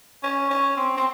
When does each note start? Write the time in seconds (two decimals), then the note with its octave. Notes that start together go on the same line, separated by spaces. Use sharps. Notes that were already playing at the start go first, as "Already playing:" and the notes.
0.23 C#4
0.50 C#4
0.77 C4
0.97 C4